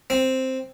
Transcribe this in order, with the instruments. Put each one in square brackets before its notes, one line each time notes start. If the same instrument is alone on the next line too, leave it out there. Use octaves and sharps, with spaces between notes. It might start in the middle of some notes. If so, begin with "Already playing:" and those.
[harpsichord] C4